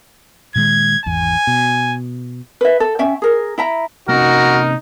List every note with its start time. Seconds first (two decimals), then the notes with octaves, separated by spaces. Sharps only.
0.55 A#2 D#3 G#3 G#6
1.06 G#1 E2 G#5
1.47 B2
2.61 B4 E5
2.80 A4
2.99 C#4 E5 G5
3.22 G#4 A#4
3.58 E4 E5 A#5
4.09 C3 A#3 C#4 D#4 F#4 A#4